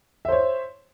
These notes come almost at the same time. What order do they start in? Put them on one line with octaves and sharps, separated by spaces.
E5 C5 C#5